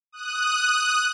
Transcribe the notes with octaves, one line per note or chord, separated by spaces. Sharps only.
D#6 F#6